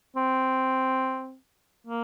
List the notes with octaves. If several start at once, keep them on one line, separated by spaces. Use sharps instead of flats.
C4
A#3